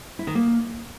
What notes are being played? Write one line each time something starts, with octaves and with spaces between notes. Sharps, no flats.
E4
D#3
A#3